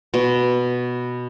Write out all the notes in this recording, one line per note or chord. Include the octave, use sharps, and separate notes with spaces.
B2